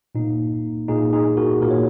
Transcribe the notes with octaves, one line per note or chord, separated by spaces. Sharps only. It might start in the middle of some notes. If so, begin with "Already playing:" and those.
A#2 A#3 D#4
A#2 A#3 D#4 G#4
D#4 G#4
F#4 A#4
A#2 A#3 A#4
C#5